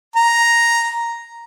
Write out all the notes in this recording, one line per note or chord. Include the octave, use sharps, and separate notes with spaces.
A#5